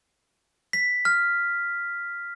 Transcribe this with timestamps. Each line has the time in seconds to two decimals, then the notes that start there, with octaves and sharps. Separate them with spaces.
0.73 B6
1.05 F6